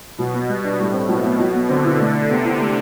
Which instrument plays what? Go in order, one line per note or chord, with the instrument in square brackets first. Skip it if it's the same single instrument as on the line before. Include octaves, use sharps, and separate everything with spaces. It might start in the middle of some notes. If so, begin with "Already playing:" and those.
[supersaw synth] B2 [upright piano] F#3
[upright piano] B3
G3
D4
[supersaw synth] A2 [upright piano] G3
[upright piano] C4
[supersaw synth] B2 [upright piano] F#3
[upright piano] B3
F#3
B3
[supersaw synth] D3 [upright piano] C4
[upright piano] E4
A3
D4
[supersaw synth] C3 [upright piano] B3
[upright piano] E4
A3